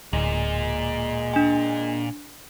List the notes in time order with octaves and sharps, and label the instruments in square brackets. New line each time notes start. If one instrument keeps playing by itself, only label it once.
[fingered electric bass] D1 [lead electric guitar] A#2 [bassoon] G#3
[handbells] D4 G#5